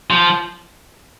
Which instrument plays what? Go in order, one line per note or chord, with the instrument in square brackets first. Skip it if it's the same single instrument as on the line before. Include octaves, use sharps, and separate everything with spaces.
[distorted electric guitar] F3